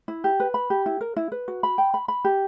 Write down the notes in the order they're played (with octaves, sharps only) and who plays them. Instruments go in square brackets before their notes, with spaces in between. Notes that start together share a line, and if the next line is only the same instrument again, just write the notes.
[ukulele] E4
G4
B4
B5
G4
E4
A#4
E4
B4
F#4
B5
G5
B5
B5
G4